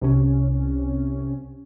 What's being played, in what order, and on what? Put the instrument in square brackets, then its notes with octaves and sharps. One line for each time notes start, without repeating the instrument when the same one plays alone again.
[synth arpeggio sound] C2 C3 C#4